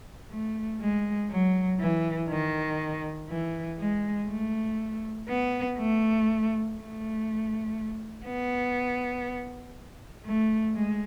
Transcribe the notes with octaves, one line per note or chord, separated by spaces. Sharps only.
A3
G#3
F#3
E3
D#3
E3
G#3
A3
B3
A3
A3
B3
A3
G#3